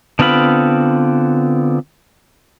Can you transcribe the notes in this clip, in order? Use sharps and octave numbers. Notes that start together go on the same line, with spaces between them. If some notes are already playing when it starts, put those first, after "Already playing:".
D3 B3 C4 F4 B5